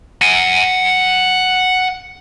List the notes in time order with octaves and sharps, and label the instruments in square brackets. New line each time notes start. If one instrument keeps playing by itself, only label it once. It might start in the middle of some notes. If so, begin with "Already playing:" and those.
[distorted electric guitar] F#5 G#5